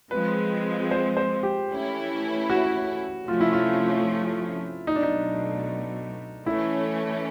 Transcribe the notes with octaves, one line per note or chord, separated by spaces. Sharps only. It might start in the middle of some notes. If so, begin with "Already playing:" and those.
F3 G#3 C4 B4
C5
C5
G4
E3 A3 C#4 E4
F#4
C3 F3 A3 C#4 F4
E4
F4
B2 F#3 A3 D#4
D4
D#4
E3 A3 C#4 E4